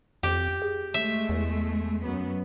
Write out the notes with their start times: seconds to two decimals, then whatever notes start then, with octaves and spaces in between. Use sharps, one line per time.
0.23 F2 G4
0.62 G#4
0.94 G#3 A3 E5
1.29 E2
2.03 F#2 B3